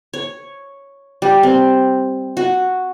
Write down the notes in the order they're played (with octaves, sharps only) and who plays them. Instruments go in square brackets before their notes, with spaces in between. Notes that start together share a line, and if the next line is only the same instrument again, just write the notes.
[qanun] C#5
G3
C4
F#4